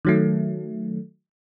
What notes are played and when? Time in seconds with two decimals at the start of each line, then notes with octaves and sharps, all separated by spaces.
0.05 D#3 F#3 A3